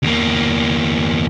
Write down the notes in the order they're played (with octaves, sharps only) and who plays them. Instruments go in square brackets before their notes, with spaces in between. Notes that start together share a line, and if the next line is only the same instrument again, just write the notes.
[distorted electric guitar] E2 A#3